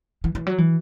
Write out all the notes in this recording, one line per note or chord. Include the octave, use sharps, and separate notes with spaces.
E3
E3
F#3
E3